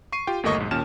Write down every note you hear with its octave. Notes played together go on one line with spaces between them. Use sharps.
C#6 C7 D#7
F4 G4 G5
G1 D#2 A3 A#3 D#5 C#6
B1 G#2
D#2 A#2 C#4 A5 F6 E7